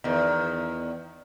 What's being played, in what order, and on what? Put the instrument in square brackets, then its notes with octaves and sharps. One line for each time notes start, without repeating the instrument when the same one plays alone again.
[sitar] E2 D#3